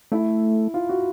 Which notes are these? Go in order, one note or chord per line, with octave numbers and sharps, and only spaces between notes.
A3 E4
F4
F#4